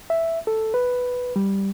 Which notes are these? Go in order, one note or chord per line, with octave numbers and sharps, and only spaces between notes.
E5
A4
B4
G3